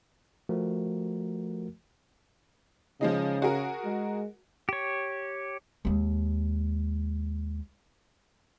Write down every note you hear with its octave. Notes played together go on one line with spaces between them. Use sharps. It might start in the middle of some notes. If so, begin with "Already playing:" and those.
F3 A3 F#4 A#4
C#3 F3 G#3 D#4
F#4 G#4 A#4
G#3
G4 C#5
D#2 G#3